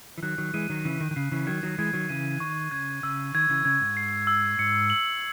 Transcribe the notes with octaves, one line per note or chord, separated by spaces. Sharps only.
E3
D#3 F#3 F#6
D#3 F#3
E3 G#3 D#7
D#3 F#3
C#3 E3 D#7
D#3
D#3
C#3 C7
C#3 E3
D#3 F#3 G#6
D#3 F#3
E3 G#3 G#6
D#3 F#3
C#3 E3 D#7
D#3 C#6
C#3 G#6
C#3 E6
D#3 G#6
C#3 E3
C#3 G#6
G#2
C7
E6
G#2 C#7
F#7